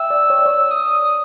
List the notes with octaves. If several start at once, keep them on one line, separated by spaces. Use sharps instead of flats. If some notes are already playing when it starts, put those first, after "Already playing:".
Already playing: E5 G5 E6
D5
C#5
D5
C#5
D#6